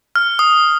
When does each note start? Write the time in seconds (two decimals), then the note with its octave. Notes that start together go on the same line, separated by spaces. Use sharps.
0.16 F6
0.39 D#6